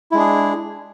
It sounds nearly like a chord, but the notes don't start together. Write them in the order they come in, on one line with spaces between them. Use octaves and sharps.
E4 G#3 D4 G#4